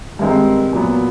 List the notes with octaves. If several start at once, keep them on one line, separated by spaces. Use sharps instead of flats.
G2 D#3 G#3 C4
A#2 F#3 B3